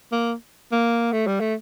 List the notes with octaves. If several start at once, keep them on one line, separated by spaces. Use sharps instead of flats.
A#3
A#3
A3
G3
A3